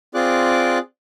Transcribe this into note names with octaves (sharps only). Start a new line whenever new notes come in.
C4 F4 G#4 D5 D6 F#6